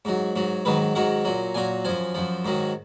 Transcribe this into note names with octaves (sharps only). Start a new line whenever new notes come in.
G#2 F#3
G#2 F#3
G#2 D#3 F#3 B4
G#2 D#3 F#3 F#5
A#2 F#3
A#2 F#3 G#5
F#2 F3 G#5
F#2 F3
G#2 D#3 F#3